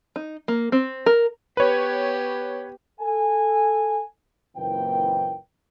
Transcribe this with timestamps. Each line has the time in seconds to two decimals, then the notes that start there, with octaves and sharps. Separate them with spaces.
0.16 D#4
0.48 A#3
0.72 C4
1.06 A#4
1.57 B3 G4 B4 C#5
3.00 A4 G#5
4.56 F#1 A#2 E3 C4 B4 G5